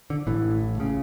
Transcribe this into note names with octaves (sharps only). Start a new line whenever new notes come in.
D3
A1 A2 E3
C#2 C#3